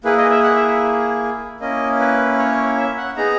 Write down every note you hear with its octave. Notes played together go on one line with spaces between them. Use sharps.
A#3 E4 G#4 B4
D#5
E5
F#5
E5
A#3 C#4 E4 D#5
B4
C#5
E5
F#5
B3 D#4 G#4 A#5